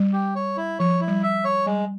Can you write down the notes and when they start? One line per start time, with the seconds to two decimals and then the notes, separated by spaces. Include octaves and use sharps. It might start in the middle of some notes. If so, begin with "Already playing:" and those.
Already playing: G3
0.13 G4
0.35 C#5
0.57 E4
0.79 F3 C#5
1.00 E4
1.08 G3
1.23 E5
1.44 C#5
1.66 G3 G#3